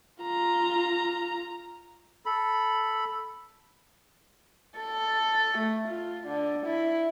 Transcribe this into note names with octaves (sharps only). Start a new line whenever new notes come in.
F4 A#5
A4 B5
A4
A3
F4
D3
E4